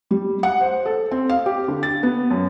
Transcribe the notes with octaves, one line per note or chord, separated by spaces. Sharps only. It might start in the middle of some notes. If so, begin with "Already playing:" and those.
G3
F#5
C5
A4
C4
F5
G4
D3
A6
B3
F#2